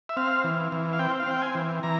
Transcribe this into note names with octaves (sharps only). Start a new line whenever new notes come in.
E5
C4 F5
E3
E3
F5
C4 G5
F5
C4 G5
G#5
E3
E3 A#5